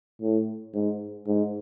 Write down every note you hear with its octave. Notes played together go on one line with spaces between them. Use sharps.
A2
G#2
G#2